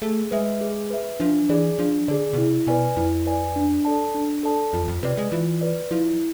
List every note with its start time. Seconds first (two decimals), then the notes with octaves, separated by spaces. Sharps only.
0.02 A3 G#4
0.31 G#3 B4 E5
0.61 G#4
0.90 B4 E5
1.20 F3 D4
1.49 E3 G#4 D5
1.79 F3 D4
2.08 D3 G#4 D5
2.33 B2
2.38 C3 E4
2.67 B2 B4 D5 G#5
2.96 F2 E4
3.26 B4 D5 G#5
3.56 D4
3.85 A4 D5 A5
4.15 D4
4.43 A4 D5 A5
4.73 F2 F4
4.82 E2
4.88 F2
5.03 C3 B4 D5
5.17 G#3
5.32 E3 F4
5.61 B4 D5
5.91 F3 E4